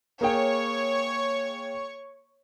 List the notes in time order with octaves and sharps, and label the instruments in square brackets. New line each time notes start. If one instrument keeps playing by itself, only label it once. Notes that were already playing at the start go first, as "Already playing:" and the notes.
[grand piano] A#3 G#4 G5 [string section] C#5 C#6